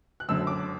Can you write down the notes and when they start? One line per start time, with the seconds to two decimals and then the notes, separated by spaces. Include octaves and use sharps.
0.20 F#6
0.29 F#1 F#2 D3 E6
0.47 D6